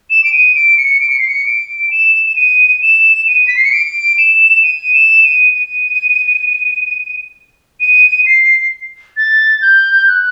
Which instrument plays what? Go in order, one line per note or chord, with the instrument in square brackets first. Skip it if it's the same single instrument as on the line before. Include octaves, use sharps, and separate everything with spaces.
[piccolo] E7
D7
D#7
D7
C#7
D7
C#7
C7
C#7
D7
E7
E7
D#7
E7
D#7
B6
C7
C#7
D7
E7
D#7
E7
D#7
D#7
D#7
C7
A6
G6
F#6